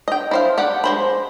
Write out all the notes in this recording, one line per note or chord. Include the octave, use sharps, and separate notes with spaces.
D#5 G5
E4 C5 F5
G4 D5 F#5
G#3 C5 B5